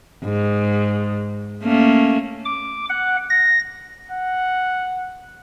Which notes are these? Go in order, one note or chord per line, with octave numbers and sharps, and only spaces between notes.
G#2
A3 A#3 C#4
D6
F#5
A#6
F#5